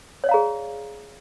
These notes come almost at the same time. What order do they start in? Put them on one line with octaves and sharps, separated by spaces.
C#5 D5 F5 A#5 G#4